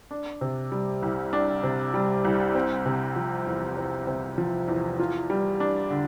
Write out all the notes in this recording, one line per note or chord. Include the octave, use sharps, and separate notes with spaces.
D4
C3
G3
C2
D4
C3
G3
C2
C4
C3
F3
E2
C4
C3
F3
E2
F4
G3
D4
D3